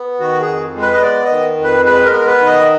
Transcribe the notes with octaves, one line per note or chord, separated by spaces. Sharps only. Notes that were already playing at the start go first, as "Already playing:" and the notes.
Already playing: B3
D#3 F#4
G#4
F2
G#3
B4
D#5
B3 D5
D#5
D#3
F2
B4
G#3 B4
A#4
B3
B4
D#3
D#5